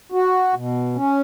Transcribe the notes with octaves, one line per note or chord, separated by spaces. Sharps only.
F#4
B2
C#4